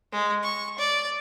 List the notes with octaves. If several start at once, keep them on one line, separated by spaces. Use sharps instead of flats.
G#3
C#6
D5